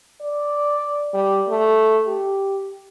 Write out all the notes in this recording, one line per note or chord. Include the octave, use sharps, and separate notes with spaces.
D5
G3
A3
G4